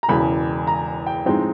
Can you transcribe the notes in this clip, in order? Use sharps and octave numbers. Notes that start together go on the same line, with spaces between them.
A#5
E1 E2 C#3 B5
A#5
G5
A2 F3 G#3 C4 D#4 G5